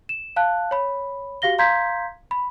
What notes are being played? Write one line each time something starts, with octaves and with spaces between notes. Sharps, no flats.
E7
F5 A5 F#6
C#5 B5
F#4 G4 F5 A#6 G7
F5 A#5 C6 G6 G#6 B6
B5